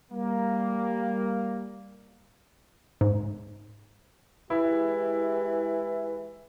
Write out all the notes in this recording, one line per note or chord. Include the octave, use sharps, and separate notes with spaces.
G3 A#3
G#2
E3 G#3 E4 G4 G#4